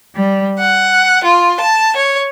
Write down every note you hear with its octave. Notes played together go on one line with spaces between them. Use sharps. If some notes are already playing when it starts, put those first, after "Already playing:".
G3
F#5
F4
A5
C#5